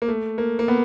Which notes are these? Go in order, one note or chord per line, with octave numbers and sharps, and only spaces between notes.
A#3
A3
A#3
A#3
B3